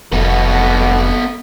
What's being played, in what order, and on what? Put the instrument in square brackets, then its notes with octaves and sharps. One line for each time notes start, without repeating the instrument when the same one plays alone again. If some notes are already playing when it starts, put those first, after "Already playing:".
[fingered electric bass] F1 [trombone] B2 [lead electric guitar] B3 A4